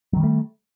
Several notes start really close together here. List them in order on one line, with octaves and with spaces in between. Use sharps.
F#3 D#3 G3 A3